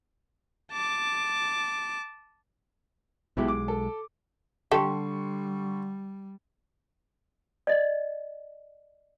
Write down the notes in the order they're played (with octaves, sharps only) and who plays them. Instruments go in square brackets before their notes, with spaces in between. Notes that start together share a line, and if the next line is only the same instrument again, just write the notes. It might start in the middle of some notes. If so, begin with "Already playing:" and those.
[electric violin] A5 D6
[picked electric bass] B1 G#3 [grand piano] B2 E4 G4
[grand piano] D6
A4
[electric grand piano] D3 C6 C#6 [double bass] G3 [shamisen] G4 A4
[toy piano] D5 D#5